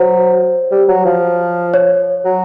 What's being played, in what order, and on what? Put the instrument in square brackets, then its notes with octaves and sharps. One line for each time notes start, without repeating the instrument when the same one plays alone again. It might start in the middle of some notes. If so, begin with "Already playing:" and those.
Already playing: [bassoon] F#3 [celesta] C5
[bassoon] G3
F#3
F3
[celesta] C#5
[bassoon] F#3